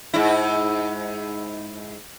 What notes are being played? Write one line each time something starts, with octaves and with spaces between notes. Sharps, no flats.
G#2 E4